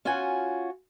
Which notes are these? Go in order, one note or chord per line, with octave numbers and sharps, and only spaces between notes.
C#4 F4 F#4 F#5 G#5